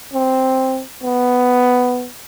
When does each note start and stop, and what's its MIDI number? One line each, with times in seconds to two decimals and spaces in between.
0.14 0.82 60
1.03 2.08 59